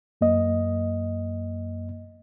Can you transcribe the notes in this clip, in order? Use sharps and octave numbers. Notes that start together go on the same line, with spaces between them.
F#2 A#3 D#5